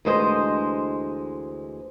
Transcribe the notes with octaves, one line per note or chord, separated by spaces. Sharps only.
D2 E3 G#3 C5 D#5